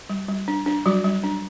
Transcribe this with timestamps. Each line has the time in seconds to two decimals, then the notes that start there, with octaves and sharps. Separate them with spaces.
0.10 G3
0.29 G3
0.48 D4
0.66 D4
0.86 F#3 G3 F#4
1.04 G3
1.24 D4